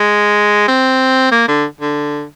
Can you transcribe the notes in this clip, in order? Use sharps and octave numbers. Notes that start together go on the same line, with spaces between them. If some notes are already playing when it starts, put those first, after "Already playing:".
Already playing: G#3
C4
A#3
D3
D3